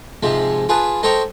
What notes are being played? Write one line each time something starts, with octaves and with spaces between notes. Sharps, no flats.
G#2 C3 F3 G#3
F4 G#4 B4 A5
D#4 A4 C5 G5 A#5 C#6